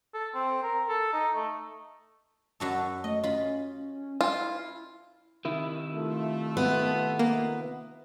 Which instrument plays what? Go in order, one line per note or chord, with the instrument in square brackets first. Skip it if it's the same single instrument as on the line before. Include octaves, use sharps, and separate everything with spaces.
[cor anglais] A4
C4
A#4
A4
D#4
A3
[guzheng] F#2 F#4 A4
[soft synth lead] A3 [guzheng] D#5
[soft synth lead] C#4 [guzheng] F4 B5
[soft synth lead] E4 [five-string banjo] F4
[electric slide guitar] C3 D#3 E4
[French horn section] A3 F4
[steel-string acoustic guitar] B3
[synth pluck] A#3